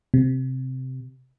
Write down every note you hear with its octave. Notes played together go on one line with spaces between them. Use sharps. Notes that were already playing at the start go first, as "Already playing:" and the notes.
C3